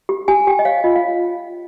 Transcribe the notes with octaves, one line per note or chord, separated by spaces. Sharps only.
G4
G4 G#5
G4 G5
D#5
C#5 F5
F4 D#5
F5